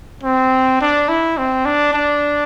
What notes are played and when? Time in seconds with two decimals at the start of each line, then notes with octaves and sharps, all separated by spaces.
0.23 C4
0.81 D4
1.08 E4
1.38 C4
1.65 D4
1.94 D4